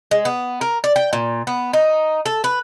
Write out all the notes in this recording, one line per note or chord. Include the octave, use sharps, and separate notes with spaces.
G#3
B3
A#4
D5
G5
A#2
B3
D#4
A4
B4